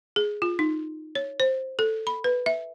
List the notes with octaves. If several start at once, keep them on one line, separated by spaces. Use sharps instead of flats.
G#4
F4
D#4
C#5
C5
A4
B5
B4
E5